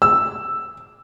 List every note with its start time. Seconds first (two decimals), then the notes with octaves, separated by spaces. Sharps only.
0.02 E6